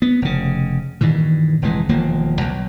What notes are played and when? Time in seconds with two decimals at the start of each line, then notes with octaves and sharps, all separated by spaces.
0.02 B3
0.22 F1 C#3
1.01 G2 A#2 D#3 E3
1.62 F1 F2 E3 G#3
1.89 E1 D#2 F3 A#3
2.41 B1